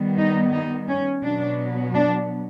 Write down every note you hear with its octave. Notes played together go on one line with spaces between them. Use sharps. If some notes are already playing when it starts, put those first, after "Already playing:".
Already playing: D#3 G3 B3
D#4
D#4
C#4
B2 F#3 B3 D4
D4